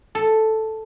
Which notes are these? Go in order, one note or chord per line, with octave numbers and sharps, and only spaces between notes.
A4